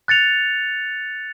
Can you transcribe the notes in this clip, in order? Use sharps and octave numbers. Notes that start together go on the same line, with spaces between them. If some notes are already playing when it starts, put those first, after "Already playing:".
F#6 A6 C#7 F7